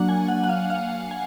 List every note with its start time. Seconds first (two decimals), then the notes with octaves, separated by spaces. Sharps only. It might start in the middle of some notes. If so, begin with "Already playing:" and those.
Already playing: F#3 A#3 D4 F#5
0.09 G#5
0.28 F#5
0.44 F#5
0.49 F5
0.70 F5
1.11 G#5